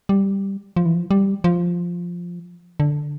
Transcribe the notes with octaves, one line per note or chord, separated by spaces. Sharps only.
G3
F3
E3
F3
G3
F3
D3